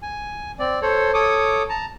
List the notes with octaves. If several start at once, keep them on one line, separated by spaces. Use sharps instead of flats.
G#5
C4 D5
A4 C5 C#5
A4 C#5 D6 D#6
A5 A#5